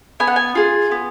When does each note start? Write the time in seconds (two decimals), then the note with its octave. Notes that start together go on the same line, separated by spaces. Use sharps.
0.20 B3 G#5
0.27 F#5
0.36 G#5
0.55 F4 G#4
0.91 B3